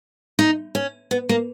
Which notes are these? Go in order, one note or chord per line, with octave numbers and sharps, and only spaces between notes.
D#4
C#4
B3
A#3